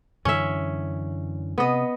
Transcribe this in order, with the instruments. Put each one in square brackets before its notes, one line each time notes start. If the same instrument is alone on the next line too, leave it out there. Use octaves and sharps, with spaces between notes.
[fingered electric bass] F#2 D3 E3 [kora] C#4 E5
[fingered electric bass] C3 [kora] B3 D#5